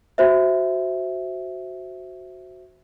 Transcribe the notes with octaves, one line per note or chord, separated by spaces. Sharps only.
F#4 C5 E5